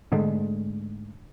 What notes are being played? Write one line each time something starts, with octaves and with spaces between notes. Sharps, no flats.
G#2 D3 G#3 A3